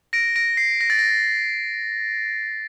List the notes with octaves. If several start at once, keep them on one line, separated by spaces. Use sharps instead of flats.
A#6 D7
A#6 D7
C7
A#6
A6
A#6